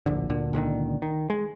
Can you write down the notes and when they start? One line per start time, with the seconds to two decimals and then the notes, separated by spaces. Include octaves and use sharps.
0.06 D1 A#1 D3
0.30 D2 A#2 D3
0.53 C#2 A#2 D3 D#3
1.02 D#3
1.30 G#3